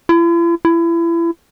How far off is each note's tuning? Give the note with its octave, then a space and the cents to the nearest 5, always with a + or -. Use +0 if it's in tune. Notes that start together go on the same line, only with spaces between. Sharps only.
E4 +45
E4 +30